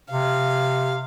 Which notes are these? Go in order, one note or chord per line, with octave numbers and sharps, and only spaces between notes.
C3 F5